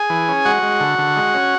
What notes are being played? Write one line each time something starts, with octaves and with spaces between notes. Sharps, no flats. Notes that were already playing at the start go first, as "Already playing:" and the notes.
Already playing: G#4 G#5
E3
C#4
G#3 F#4 F#5
G#3
D3
D3
G#3
C#4